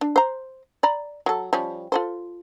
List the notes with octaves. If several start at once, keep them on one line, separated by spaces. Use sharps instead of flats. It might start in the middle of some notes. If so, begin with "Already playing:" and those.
D4
C5 A#5
D5 A#5 B5
F#3 A4
F3 G3 C#4
F4 A4 C5